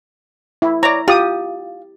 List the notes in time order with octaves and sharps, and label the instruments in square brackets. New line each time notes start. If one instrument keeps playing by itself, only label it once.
[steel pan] E4
[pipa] C#5 D5 [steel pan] A#5
[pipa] F4 [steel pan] G4 D#6